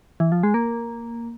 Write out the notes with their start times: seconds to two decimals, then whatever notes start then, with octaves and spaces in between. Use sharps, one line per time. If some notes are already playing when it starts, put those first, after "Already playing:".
0.20 E3
0.32 F3
0.43 G#3
0.54 A#3